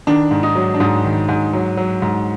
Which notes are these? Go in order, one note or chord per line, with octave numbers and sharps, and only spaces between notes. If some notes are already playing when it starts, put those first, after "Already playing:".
D#3 D4
G#2
D#4
F#3
D4
G#2 D#4
D#3
G#2
F#3
F#3
G#2